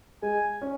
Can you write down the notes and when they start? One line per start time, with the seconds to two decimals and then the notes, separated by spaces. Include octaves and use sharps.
0.22 G#3 G#5
0.62 C#4